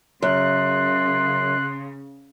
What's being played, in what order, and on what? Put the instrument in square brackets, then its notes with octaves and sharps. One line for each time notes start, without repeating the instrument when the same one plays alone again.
[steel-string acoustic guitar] F#2 [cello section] C#3 [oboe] C6 [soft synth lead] F#6